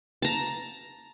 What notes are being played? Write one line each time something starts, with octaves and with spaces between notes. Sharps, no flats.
A5 A#5